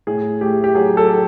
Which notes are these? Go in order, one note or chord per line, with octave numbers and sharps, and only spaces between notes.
A2 G#4
A3 G4
G4
F#3 G#4
A4
F#3